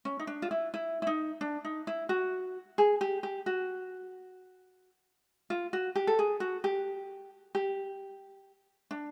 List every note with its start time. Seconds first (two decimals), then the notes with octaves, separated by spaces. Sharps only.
0.05 C#4
0.19 D#4
0.27 D4
0.42 F4
0.51 E4
0.74 E4
1.02 E4
1.07 D#4
1.41 D4
1.65 D#4
1.87 E4
2.09 F#4
2.78 G#4
3.01 G4
3.23 G4
3.46 F#4
5.50 F4
5.73 F#4
5.96 G4
6.07 A4
6.19 G#4
6.40 F#4
6.64 G4
7.55 G4
8.91 D4